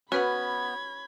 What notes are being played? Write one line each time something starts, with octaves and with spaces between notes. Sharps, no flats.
B3 C#4 F#4 B4 F#5 B5 G#6